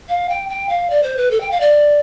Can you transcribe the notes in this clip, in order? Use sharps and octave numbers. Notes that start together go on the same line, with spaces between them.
F5
G5
G5
F5
D5
C5
B4
A4
G5
F5
D5